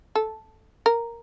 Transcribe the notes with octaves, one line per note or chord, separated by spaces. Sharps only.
A4
A#4